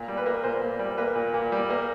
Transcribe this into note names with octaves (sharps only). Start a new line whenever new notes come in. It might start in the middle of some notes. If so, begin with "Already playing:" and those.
Already playing: A#2
G3
B4
A#3
A#2 C5
A#2
G3
A#3 B4
A#2
A#2
G3
A#3